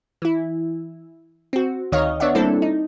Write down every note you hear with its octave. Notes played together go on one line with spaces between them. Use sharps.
E3 E4
C4 F#4
D2 D#3 C#5 D#5 F5 F6
B3 D4 C#5 D5 E5 F#5
G3 A#3 C4 D4 E4 A4
D#4